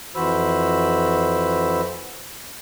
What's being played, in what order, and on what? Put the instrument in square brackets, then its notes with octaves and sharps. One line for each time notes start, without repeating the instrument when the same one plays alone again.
[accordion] F2 E3 F#4 C5 B5 E6